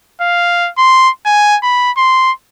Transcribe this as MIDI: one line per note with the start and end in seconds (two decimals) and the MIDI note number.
0.21 0.70 77
0.78 1.09 84
1.26 1.57 80
1.63 1.91 83
1.97 2.31 84